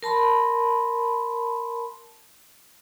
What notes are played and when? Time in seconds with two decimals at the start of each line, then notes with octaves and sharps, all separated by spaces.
0.03 A#4 A5 B5 C6